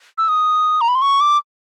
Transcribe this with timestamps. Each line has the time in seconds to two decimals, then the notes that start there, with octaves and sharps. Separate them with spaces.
0.18 E6
0.28 D#6
0.81 A#5
0.88 B5
0.95 C6
1.02 C#6
1.21 D6